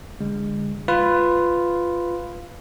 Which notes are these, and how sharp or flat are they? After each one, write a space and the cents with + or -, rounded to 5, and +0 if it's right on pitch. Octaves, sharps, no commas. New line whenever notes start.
D3 -15 G#3 -30
F4 +0 B4 +10